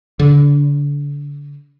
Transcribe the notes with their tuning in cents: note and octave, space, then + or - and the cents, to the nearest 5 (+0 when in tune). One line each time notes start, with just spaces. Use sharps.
D3 -30